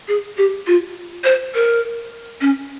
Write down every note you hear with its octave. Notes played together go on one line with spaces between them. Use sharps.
G#4
G4
F4
C5
A#4
C#4